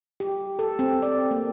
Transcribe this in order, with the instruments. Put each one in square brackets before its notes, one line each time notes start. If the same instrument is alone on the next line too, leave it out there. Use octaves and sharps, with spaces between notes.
[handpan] G4
A4
C4
D5
A#3